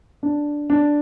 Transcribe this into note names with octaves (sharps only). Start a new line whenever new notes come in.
D4
D4